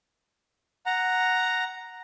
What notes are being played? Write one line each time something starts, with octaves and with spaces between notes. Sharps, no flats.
F#5 A#5